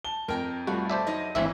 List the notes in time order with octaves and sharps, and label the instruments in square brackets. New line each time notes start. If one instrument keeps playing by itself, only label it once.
[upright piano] A5 [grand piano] G7
[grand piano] F2 [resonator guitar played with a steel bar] A#4 G5 A#5
[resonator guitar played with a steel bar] B2 [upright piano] G3 A3 F4 [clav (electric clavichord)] F#4
[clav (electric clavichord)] C5 D5 E5 [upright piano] A5
[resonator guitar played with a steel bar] F#3 D#4 D#5
[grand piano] G#1 E3 [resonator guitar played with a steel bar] A#2 [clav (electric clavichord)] C4 E4 E5